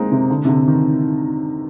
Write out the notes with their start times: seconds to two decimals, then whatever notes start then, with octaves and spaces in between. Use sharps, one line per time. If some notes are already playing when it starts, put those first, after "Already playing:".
Already playing: G#3 A#3 C4 D#4
0.12 C3
0.30 D3
0.45 C3
0.49 D3
0.68 D#3